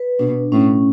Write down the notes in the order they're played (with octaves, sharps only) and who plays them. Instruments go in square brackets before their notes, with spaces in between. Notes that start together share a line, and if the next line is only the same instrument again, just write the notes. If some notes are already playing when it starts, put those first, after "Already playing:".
Already playing: [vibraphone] B4
[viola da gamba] B2 [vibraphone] D4
[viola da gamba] A2 [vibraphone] C#4